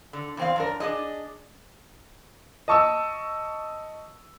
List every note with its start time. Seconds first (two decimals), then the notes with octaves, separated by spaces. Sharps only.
0.13 D3
0.37 E2 C4 F5
0.56 F#2 D4 A#4
0.80 D4 G#4 D#5
2.68 D#5 A5 C#6 D#6 E6